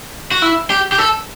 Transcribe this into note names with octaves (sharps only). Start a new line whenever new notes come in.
F#4
E4
G4
G4
A4